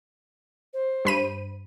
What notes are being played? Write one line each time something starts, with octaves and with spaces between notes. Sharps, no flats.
C5
G2 B5 D#7